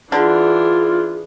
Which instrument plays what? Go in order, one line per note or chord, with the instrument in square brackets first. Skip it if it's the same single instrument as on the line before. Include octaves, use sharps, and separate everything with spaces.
[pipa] D3 [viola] E3 D4 [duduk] F4 [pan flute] G#4